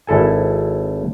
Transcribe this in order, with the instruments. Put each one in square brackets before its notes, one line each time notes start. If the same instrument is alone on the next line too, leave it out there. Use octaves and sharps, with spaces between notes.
[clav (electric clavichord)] G#1 E4 A4 G#5